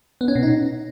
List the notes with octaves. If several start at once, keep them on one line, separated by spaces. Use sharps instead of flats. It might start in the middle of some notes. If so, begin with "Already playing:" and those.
B3
C#4
B2
D#4